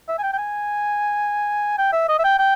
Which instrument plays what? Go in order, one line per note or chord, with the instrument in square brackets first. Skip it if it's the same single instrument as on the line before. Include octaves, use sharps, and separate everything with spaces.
[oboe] E5
G#5
G5
G5
G#5
G5
E5
D#5
E5
G5
G5